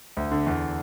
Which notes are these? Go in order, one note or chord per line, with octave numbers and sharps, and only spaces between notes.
D2
D3
E2